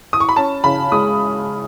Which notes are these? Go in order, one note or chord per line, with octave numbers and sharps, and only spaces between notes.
D#6
C#6
B5
C#4 A5
C#3 B5
G#3 D#6